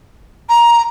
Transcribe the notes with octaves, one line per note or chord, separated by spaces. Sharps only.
A#5